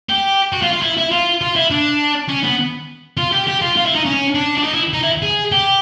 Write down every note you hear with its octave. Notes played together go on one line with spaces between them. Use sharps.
G4
F#4
F4
F4
E4
E4
F4
F4
E4
D4
C#4
B3
F4
G4
G4
F4
F4
E4
D#4
C#4
D4
D4
D#4
E4
D#4
E4
G#4
G4